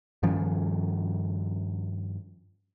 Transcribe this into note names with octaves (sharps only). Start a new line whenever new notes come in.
G2 D#3 F3 C#4